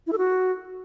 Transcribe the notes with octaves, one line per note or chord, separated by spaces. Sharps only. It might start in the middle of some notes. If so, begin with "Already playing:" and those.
E4
A4
F#4